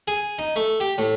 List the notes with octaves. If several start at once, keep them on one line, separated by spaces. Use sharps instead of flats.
G#4
D#4
A3
G4
A2